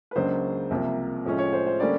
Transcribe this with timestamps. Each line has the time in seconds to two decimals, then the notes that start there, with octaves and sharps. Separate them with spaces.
0.11 B4
0.16 C#2 C#3 F#3 A#3 D4 C5
0.70 C2 C3 F3 A#3
1.25 A2 F3 G#3 C#4
1.39 C#5
1.53 C5
1.66 C5
1.80 D3 G3 A#3 C#4 D5